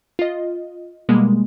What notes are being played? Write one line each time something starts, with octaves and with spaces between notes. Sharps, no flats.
F4 D#5
B2 G3 G#3 A#3